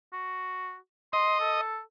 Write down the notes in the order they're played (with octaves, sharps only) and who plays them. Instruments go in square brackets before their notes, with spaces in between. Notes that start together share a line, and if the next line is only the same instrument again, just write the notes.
[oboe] F#4
[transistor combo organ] D#5 [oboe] C6
[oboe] A4